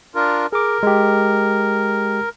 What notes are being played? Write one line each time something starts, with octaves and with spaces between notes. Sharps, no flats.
D4 F4 A#4
G#4 A#4 D6
G#3 G4